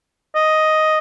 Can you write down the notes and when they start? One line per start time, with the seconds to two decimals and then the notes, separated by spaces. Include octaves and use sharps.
0.35 D#5